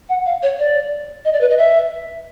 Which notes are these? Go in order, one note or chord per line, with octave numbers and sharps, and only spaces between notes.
F#5
F5
C#5
D5
D#5
D5
B4
D#5
E5